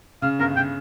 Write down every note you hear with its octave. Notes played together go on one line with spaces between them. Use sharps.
C#3 F5
G1 A#4
C#3 G5